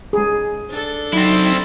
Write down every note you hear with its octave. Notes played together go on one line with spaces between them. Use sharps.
G#3 G#4
D4 A4
F#3 C4 D#4 E4